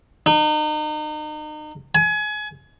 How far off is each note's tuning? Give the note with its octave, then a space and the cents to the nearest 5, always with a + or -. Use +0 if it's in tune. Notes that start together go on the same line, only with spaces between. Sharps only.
D#4 -35
G#5 +30